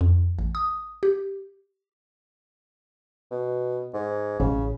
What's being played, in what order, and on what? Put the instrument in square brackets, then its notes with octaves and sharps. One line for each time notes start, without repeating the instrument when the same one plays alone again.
[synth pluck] F2
A1
D#6
G4
[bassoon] B2
G#2
[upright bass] A1 [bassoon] C#3